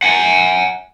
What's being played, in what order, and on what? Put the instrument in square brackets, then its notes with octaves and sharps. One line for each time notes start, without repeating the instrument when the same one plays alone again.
[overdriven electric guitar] F#5 G#5